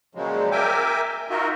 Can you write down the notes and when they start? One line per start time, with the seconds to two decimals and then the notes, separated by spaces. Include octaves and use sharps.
0.15 A#2 C#3 F3 F#3 G#3
0.51 A#4 E5 G5 G#5 D6
1.30 D#4 F4 F#4 A#4 D#5 E5